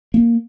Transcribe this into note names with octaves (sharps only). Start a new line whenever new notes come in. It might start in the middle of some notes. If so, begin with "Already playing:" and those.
A#3